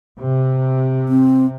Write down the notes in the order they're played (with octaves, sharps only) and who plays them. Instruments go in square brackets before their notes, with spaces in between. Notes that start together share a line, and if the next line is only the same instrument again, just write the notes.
[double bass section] C3
[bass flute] C4